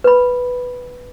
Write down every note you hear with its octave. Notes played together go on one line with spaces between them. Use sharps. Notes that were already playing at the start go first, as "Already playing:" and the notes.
B4 B5